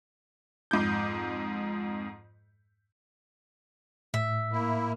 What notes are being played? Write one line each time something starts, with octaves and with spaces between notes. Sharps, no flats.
F2 G#2 D6 G6
A2 E5
A#3 E4